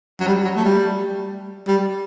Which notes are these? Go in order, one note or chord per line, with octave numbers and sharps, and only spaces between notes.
F#3
G3
F#3
A3
G3
G3